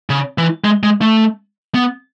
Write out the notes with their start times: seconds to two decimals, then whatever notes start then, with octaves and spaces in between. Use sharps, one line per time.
0.10 C#3
0.38 E3
0.64 G#3
0.83 G#3
1.01 A3
1.74 B3